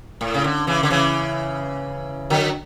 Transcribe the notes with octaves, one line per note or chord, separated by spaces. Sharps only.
A2
C#3
D3
C#3 E3
D3
C#3 E3
D3 F#3